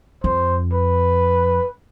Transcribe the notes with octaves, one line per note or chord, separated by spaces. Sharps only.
F2 C5
B4